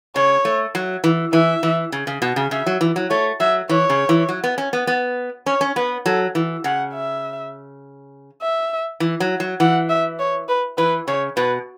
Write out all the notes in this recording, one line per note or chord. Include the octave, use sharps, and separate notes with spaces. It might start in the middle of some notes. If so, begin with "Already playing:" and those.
C#3 C#5
A3
F#3
E3
E3 E5
E3
C#3
C#3
B2
C#3
C#3 E5
F#3
E3
F#3
A3 C#5
F#3 E5
E3 C#5
C#3
E3
F#3
B3
C#4
B3
B3
C#4 C#5
C#4
B3 B4
F#3 A4
E3
C#3 F#5
E5
E5
E3
F#3
F#3
E3 F#5
E5
C#5
B4
E3 B4
C#3 C#5
B2 B4